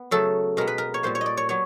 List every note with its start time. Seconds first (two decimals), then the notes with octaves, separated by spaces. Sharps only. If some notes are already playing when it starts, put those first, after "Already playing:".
Already playing: B3
0.11 C#3 F#3 A3 A4
0.57 B2 G#3 B3 A#4
0.67 B4
0.78 A#4
0.94 C#5
1.03 A#2 G3 A#3 C5
1.15 C#5
1.21 D#5
1.26 D5
1.37 C#5
1.49 F#3 B3 C#5